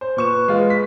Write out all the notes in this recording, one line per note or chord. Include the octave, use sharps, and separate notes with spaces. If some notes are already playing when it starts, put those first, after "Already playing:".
C5
A#2 B4 C#6 E7
G#3 F4
B6